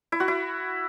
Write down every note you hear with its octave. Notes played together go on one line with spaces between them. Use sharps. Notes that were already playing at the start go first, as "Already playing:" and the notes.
E4
F#4
E4